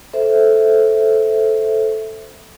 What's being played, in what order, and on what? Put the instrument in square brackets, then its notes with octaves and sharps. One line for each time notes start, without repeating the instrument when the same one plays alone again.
[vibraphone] A4 C5 E5